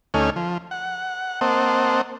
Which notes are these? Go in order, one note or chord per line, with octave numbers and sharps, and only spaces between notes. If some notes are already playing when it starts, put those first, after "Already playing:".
D2 A3 C#4 D#4 G#5 F6
F3
F#5
A#3 C4 C5 D#5 F#5 A5